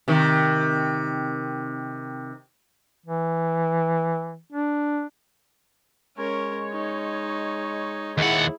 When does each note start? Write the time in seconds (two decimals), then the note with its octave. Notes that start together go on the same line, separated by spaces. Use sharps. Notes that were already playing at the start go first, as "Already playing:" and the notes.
0.08 C3 D#3
3.06 E3
4.52 D4
6.17 G#3 C#4 A#4 C#5
6.72 D#4
8.18 D#2 E4 G#4 F#5